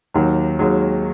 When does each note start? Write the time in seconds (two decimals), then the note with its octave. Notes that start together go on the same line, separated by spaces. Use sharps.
0.14 D#2 D#3 F#3
0.59 D#2 D#3 F#3 G#3